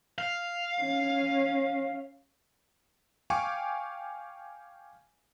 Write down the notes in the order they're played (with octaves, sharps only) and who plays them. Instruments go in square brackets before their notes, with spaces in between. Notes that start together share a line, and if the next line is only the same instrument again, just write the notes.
[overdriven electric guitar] F5
[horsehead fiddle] C#4
[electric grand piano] F5 G5 G#5 C#6 D6